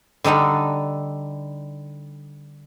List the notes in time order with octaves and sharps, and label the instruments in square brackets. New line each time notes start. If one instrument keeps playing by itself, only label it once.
[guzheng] D3 G3 D#4 A4 F#5